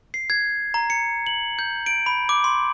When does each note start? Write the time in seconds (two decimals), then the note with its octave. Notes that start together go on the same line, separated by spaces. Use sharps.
0.14 C7
0.30 G#6
0.74 A#5
0.90 C#7
1.26 F#7
1.59 G6
1.86 D7
2.06 B5
2.29 D6
2.44 C6